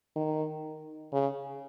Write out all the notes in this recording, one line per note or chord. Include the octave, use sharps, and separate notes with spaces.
D#3
C#3